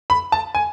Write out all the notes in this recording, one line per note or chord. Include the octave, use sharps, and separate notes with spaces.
B5
A5
G#5